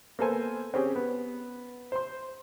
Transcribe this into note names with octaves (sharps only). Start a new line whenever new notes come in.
A#3 B3 A4 C5 G#5
C4 C#4 G4 G#4
B3
C5 C6